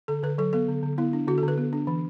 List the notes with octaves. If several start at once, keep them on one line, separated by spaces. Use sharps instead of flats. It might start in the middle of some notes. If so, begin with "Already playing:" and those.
D3 A4
D3 B4
F#3 A4
B3 A4
D3
D3
B3 E4
D4
D3 F#4
A4
D3 B4
B3
D4
E3